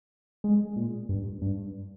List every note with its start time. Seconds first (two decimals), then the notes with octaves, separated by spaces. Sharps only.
0.44 G#3
0.76 A#2
1.09 G2
1.42 G2